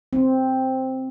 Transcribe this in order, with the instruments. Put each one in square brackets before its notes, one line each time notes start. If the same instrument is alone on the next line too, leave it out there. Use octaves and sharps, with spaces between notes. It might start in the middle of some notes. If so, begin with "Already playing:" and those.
[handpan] C4